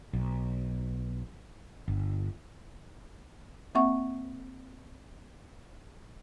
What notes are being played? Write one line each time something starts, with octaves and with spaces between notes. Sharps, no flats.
B1
G1
A#3 C4 E5 F#5 C#6